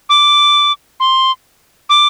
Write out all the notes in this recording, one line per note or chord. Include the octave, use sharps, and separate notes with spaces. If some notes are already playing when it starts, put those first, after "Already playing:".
D6
C6
D6